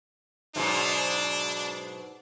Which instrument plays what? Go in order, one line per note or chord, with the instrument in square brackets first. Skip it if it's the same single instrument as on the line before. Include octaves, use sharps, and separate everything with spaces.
[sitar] G#2 B2 F#3 [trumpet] D4